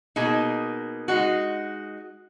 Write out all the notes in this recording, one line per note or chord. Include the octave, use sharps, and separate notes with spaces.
B2 A#3 D#4 G#4
G#3 D#4 F#4